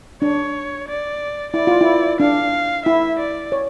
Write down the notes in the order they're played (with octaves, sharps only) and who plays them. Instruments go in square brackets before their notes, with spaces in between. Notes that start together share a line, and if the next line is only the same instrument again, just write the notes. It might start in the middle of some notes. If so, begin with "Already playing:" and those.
[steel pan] D4 [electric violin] C#5
[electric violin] D5
[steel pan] E4 [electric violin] D5
[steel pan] F4
E4
[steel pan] D4 [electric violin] F5
[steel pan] E4 [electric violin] E5
[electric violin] D5
[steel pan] C#5